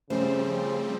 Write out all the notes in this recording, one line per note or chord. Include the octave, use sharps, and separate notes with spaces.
C#3 F3 G3 A3 C4 C#4 C5